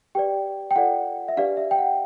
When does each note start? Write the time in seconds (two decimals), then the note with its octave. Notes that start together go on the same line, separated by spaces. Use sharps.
0.15 G4 B4 D5 G5
0.71 G5
0.76 F4 A4 D5 F#5
1.28 E5
1.37 D4 G4 B4 D5 F5
1.57 E5
1.71 G5
1.78 F#5